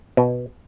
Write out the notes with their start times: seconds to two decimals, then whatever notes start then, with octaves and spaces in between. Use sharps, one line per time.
0.17 B2